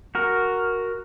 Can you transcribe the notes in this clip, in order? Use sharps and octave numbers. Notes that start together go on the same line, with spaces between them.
F#4 A#4